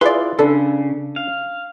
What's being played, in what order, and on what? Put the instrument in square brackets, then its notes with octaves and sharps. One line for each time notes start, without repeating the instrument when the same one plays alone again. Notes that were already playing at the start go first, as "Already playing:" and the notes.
[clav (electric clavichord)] E4 F4 G#4 [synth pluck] B4 D5 [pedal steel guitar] C6
[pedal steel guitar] C#3 [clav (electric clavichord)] D4 B4 [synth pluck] A4
[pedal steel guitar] F5